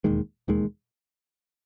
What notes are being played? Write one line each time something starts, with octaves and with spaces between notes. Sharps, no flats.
E1 D#2 D#3 G#3
E1 D#2 D#3 G#3